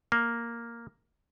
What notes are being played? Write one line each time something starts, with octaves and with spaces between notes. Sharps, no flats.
A#3